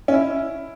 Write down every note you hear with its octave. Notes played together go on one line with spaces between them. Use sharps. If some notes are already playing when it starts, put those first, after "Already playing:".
C#4
E4